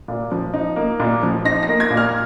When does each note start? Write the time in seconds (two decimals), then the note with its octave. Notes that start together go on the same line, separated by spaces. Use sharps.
0.08 A#2
0.32 F3
0.54 D#4
0.76 A#3
1.00 A#2
1.23 F3
1.45 D#4 A#6
1.63 A#6
1.68 A#3
1.80 G#6
1.90 A#2
1.97 F6